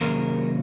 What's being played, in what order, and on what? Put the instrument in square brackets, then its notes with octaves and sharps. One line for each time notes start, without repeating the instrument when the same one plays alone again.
[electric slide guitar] C3 D#3 F#3 A#3 C#4 G#4 A#4